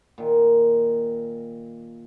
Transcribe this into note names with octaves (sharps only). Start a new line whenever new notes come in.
A#2 D#3